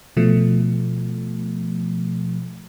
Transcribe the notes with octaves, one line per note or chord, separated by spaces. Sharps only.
B2 F3 A3